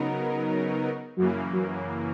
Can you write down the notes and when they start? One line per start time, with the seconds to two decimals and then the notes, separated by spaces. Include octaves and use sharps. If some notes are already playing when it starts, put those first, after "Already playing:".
Already playing: C#3 F#3 B3 D#4 A#4
1.17 F#2 C#3 E3 F#3 A#3
1.53 F#3